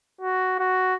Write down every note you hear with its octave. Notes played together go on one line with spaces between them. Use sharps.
F#4
F#4